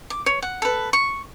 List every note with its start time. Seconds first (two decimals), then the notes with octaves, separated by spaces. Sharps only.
0.10 D6
0.26 C#5
0.42 F#5
0.62 A4 B4
0.93 C#6